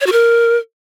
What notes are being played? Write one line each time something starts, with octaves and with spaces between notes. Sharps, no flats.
C#5
F#4
A#4